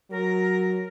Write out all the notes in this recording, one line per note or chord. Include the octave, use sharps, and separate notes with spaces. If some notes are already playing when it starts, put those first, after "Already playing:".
F#3 A#4